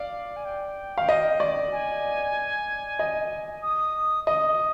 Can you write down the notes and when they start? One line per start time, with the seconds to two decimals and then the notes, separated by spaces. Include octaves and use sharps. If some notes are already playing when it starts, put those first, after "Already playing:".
Already playing: D5 F5
0.36 G#5
0.45 G5
0.98 F5
1.09 D#5
1.40 D5
1.72 G#5
2.99 D#5
3.63 D#6
4.26 D#5 D#6